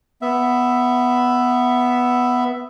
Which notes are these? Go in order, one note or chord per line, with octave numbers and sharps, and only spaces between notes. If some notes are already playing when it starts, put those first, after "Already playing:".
B3 E5